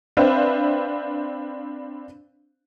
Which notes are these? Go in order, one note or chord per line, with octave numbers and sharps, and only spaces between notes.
C4 D4 B4 C5 E5 F5